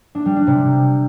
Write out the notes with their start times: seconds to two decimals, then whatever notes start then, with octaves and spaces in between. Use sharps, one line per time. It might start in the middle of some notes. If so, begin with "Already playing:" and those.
0.15 D4
0.26 G3
0.36 D4
0.47 C3